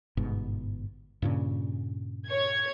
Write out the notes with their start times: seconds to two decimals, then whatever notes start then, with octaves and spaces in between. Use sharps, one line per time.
0.17 G1 G#2 B2
1.22 G2 A#2 C#3
2.28 C#5 G#6